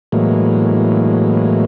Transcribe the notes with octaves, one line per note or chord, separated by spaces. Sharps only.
A2 E3 F#3 G#3 A#3